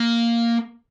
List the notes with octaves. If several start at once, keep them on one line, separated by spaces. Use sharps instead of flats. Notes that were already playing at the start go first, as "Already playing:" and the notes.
Already playing: A#3